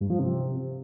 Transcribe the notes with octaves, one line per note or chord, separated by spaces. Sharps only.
G2
F3
C3